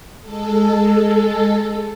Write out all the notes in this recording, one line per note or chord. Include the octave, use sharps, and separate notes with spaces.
G#3 A4